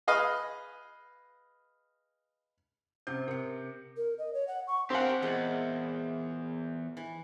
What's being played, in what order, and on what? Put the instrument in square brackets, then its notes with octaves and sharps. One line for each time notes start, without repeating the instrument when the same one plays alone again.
[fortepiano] G#4 B4 D#5 F5
[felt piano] C3 G6 [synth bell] C#4 C5
[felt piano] C3 C#7 [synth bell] A#4
[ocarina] A#4
D#5
C#5
F#5
C#6
[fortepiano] C4 F#5 [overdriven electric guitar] G4 A#4
[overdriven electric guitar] E2 [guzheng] A#2 G#3 F4
[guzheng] E3